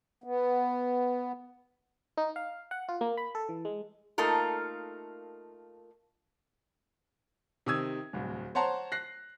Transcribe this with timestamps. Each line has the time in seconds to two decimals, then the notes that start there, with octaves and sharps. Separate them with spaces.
0.24 B3
2.17 D#4
2.36 F5
2.71 F#5
2.89 F4
3.01 A#3
3.17 B5
3.35 A4
3.49 E3
3.65 G#3
4.18 A3 A#3 D#4 F4 A4 A#4
7.66 C3 D#3 D#6 E6 G#6
8.13 D1 C2
8.55 C5 C#5 F#5 A5 A#5 C6
8.92 F#6 A#6 C7